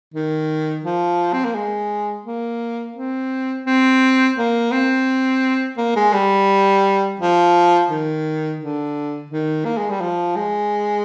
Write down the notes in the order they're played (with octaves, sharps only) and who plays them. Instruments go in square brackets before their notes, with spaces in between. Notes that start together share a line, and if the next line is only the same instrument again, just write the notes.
[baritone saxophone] D#3
F3
C4
A#3
G#3
A#3
C4
C4
A#3
C4
A#3
G#3
G3
F3
D#3
D3
D#3
A#3
G#3
G3
F3
G#3